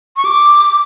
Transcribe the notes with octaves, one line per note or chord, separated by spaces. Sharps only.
C#6
D6